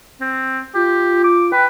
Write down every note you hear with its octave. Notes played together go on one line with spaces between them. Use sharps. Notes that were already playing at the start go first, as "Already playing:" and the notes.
C4
F4 G4
D6
B4 G5